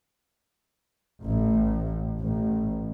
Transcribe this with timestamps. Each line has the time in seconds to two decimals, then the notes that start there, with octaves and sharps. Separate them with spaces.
1.24 A1
2.20 A1